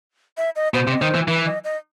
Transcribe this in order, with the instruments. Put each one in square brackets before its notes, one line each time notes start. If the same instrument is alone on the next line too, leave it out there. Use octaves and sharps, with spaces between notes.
[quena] E5
D#5
[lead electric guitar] B2 [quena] C5
[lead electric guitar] C3
[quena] D#5
[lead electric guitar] D#3 [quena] C5
[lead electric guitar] E3
[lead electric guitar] E3 [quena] B4
[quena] D#5
D#5